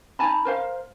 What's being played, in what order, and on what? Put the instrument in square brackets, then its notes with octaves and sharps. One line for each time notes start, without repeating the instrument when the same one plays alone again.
[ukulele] D#4 G#5 A5 B5
A#4 C5 F5